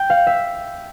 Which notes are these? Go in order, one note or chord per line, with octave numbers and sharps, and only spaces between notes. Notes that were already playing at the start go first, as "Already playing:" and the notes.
Already playing: G5
F5
E5